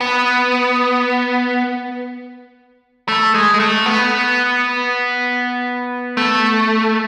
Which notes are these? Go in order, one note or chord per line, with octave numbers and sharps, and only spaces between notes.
B3
A3
G#3
G#3
A3
B3
A3